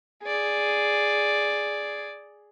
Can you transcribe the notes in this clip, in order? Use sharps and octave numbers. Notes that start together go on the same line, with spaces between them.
G#4 D5